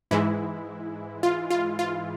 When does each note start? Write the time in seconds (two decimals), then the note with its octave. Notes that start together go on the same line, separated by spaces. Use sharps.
0.11 G#2 E3 G#3 E4
1.23 F4
1.50 F4
1.79 F4